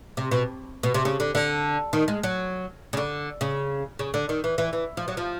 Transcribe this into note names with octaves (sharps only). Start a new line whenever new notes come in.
C3
B2
B2
C3
C#3
D3
D3
D#3
G#3
F#3
C#3
D3
C#3
C#3
D3
D#3
E3
E3
E3
F3
F#3
F3